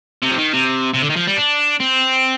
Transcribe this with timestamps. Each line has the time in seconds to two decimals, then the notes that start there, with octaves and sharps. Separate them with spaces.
0.22 C3
0.31 F3
0.37 D#3
0.53 C3
0.94 C3
1.02 D3
1.10 D#3
1.16 F3
1.28 G3
1.38 D4
1.80 C4